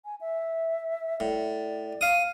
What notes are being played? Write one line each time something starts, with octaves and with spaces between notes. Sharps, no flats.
G#5
E5
A2 D5
F5 D#6